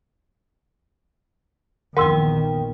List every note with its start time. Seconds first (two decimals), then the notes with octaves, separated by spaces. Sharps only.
1.97 A#1 E2 D#3 A#4 F#5 G5 C6 E6